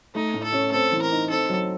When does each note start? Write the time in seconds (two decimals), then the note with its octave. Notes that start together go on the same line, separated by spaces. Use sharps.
0.15 A3 D#4
0.34 A2
0.44 A4
0.52 C#4
0.72 C4 A4
0.92 E3
1.02 A#4
1.11 D#4
1.30 C4 A4
1.49 F#3